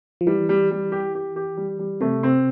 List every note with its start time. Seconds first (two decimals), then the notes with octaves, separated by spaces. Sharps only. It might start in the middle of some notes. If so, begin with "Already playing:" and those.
0.21 F3
0.27 E3 G3
0.49 G3
0.71 G3
0.92 G4
1.15 G4
1.36 G4
1.57 G3
1.79 G3
2.01 C3 A3
2.23 C4